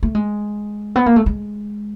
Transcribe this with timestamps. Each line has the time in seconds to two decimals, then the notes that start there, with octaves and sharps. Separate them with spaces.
0.03 A3
0.15 G#3
0.96 B3
1.06 A#3
1.16 A3
1.26 G#3